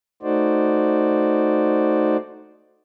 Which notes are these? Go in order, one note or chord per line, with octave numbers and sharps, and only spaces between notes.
A3 D#4 F#4 C5 D5